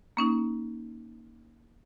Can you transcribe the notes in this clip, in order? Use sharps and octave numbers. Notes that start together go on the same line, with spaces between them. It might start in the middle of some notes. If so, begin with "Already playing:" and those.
A#3 C#4 D#4